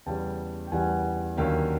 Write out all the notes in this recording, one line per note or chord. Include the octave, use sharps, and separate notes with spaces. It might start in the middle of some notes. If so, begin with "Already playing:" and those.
E2 C#3 E3 G3 G5 A5
G5
E2 C#3 E3 G3 F#5 G#5
D#2 D3 F#3 A#3 C#4 F5 G5